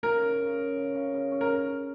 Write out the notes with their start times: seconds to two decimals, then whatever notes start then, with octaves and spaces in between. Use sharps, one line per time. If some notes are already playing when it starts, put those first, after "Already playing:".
0.03 C#3 A#4
0.21 C#4
0.40 C#3
0.58 C#3
0.77 C#3
0.95 C#3
1.13 C#3
1.32 C#4
1.41 A#4